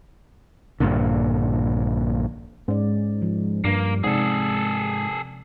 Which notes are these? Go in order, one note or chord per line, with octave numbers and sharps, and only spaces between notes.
A#1 G2 A#2 D3
G#2 C#4 D5
F3
G2 A#3
G#2 C3 G#4 A4 D5 F#5